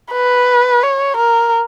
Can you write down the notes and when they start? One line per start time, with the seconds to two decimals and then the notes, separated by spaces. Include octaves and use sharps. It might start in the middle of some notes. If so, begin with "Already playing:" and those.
0.13 B4
0.83 C#5
1.17 A#4